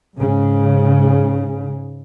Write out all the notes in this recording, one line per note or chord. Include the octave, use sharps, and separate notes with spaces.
G#2 C#3